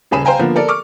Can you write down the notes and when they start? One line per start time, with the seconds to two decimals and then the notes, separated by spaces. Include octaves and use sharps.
0.11 D#1 C#3 G#4 B5 E7
0.25 C5 F5 G5 G#5 A#5
0.39 D3 F3 A#3 B3
0.56 A4 A#4 D5
0.68 C#6 D6 F6